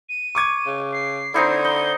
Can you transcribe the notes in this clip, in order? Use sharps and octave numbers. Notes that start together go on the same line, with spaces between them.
D#7
C#6 D6 G#6
C#3
C7
D3 C4 D#4 E4
D#4 G7